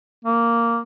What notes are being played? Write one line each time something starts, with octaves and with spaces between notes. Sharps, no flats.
A#3